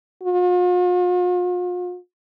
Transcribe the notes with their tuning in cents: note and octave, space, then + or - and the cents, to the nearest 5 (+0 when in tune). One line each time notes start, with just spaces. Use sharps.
F4 +45